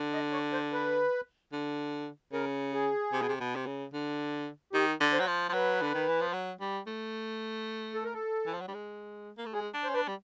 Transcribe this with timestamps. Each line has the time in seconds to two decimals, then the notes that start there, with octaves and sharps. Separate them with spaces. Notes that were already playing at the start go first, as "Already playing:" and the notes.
Already playing: D3
0.13 D#5
0.33 C#5
0.53 C5
0.73 B4
1.53 D3
2.32 C#3 A#4
2.73 G#4
3.13 C3
3.22 B2
3.29 C3
3.40 B2
3.56 C3
3.66 C#3
3.93 D3
4.73 D#3 G4
5.01 D3
5.13 C5
5.20 F#3
5.27 F3
5.49 F3
5.53 F#3 B4
5.81 D3
5.94 D#3
6.08 E3
6.21 F3
6.33 F#3
6.60 G3
6.87 A3
7.94 A4
8.04 A#4
8.14 A4
8.46 E3
8.53 F3
8.61 F#3
8.68 G3
8.74 G#3
9.38 A#3
9.46 A3
9.54 G#3 G#4
9.74 D4
9.84 C#4 C5
9.94 D4 B4
10.08 G3